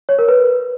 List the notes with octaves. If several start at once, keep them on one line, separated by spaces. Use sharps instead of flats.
C#5
A#4
B4